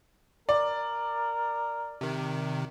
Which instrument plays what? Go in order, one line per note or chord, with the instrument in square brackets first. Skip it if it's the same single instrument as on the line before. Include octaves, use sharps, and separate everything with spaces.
[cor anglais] A#4 [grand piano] D5
[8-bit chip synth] C3 D#3